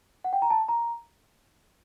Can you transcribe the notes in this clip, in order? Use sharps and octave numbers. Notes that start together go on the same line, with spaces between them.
F#5
G5
A#5
A5
A#5